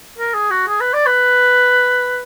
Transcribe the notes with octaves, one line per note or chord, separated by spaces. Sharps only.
A#4
G#4
F#4
G#4
B4
D5
B4